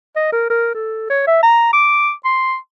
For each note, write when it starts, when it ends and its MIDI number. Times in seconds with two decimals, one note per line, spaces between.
0.16 0.32 75
0.32 0.48 70
0.50 0.71 70
0.75 1.07 69
1.10 1.25 73
1.27 1.42 76
1.43 1.73 82
1.73 2.12 86
2.25 2.56 84